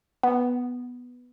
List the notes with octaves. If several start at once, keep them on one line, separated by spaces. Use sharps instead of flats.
B3